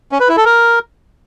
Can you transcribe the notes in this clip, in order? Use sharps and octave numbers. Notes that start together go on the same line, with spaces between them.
C#4
B4
E4
A4
A#4